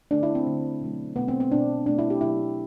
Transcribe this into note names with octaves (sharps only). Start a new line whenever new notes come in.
D3 A3 D4
E4
C4
D3 A3
B2 F#3 A3
B2 F#3 A3 B3
C4
C4
B2 A3 D4
B2 A3 D4
E4
G4
B2 F#3 A3 E4